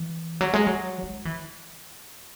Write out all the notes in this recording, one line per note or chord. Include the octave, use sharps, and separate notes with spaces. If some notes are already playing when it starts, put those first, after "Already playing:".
Already playing: E3
F#3
G#3
F#3
G#3
E3